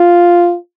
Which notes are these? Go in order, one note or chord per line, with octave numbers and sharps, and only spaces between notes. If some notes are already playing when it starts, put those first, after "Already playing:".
Already playing: F4